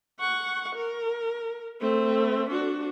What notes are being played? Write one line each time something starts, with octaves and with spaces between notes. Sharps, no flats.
F#5 C#6
A#4
A3 C4
D4 F#4